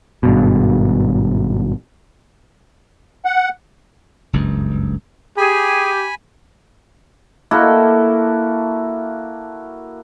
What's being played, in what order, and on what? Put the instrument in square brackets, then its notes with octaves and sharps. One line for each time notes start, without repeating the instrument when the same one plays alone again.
[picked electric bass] G#1 G2 B2
[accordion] F#5
[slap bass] F#1 C#2 G2
[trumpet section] G4 [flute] G#4 [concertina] G#5 B5
[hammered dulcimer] A#3 E4 F#4 A4